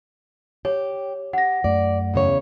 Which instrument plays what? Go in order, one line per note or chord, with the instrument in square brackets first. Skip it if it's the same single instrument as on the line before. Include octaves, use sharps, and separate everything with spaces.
[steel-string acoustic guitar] G4 [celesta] C#5
[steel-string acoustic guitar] G4 [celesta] F#5 A#6
[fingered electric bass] F#2 A3 [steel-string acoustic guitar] D5
[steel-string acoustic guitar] E2 C#3 C#5